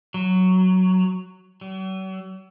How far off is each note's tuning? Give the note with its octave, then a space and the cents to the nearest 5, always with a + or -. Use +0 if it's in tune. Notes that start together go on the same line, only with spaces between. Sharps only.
F#3 +5
F#3 +45